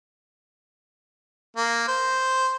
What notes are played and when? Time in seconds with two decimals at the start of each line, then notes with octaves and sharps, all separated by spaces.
1.57 A#3
1.88 C5